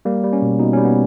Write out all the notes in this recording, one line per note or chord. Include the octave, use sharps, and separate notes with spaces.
G3 A#3
G3
C#4
B2
B2 D#4
G3 C#4
B3